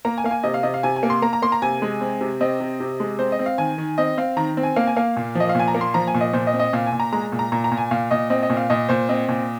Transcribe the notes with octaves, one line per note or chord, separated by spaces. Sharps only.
A#3 A#5
G#5
A#3 F5
G#5
C3 D#5
F5
C3 D#5
F5
C3 G#5
G#5
A#3
C6
A#3 A#5
A#5
A#3 C6
A#5
C3 G#5
G#3
C4
C3
C4 D#5
C3
C3
G#3
C4 C5
D#5
C4
F5
D#3 G#5
D#3
C4 D#5
C4 F5
D#3 A#5
C4
G#5
A#3 F5
G#5
A#3 F5
A#2
F3 D#5
F5
A#2 G#5
A#5
A#3
C6
F3 A#5
G#5
A#2
D#5
A#2 C5
D#5
C4
D#5
A#2 F5
G#5
A#2
A#5
G#3 A#5
A#2
A#5
A#2 A#5
A#5
A#2
G#5
A#2 F5
A#2 D#5
C4 D#5
D#5
A#2
F5
A#2 D#5
A#2 C5
C4 D#5
A#2